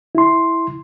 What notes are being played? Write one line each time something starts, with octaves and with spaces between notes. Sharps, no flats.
E4 C6